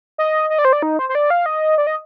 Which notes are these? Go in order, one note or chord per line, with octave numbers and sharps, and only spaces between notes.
D#5
D#5
D5
C5
D5
D#4
C5
C5
D5
F5
D#5
D5
D#5